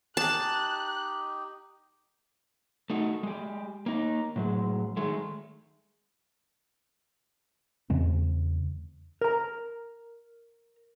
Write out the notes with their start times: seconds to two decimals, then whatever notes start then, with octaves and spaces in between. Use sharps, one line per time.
0.17 D#4 G4 A5 F#6
2.90 A3 D#4 F#4
3.23 G#3 G4
3.86 A#3 D#4
4.36 A2 F#3 G#3
4.97 D#3 G#3 A3
7.90 E2 C#3 G#3 C4
9.21 A#4 A#5